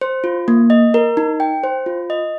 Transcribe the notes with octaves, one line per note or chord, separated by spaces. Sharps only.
C5
F4
A#3
D#5
A#4
D#4
G5
C5
F4
D#5